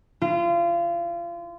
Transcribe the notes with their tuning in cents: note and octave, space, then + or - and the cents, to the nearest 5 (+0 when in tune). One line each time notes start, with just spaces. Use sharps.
F4 -30